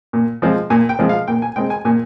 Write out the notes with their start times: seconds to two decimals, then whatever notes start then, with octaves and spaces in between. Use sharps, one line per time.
0.13 A#2
0.42 F3 G#3 C4
0.70 A#2 G#5
0.89 G5
0.99 F3 G#3 C4
1.09 F5
1.28 A#2 G5
1.42 G#5
1.56 G#3 C4 G5
1.70 G#5
1.85 A#2 G#5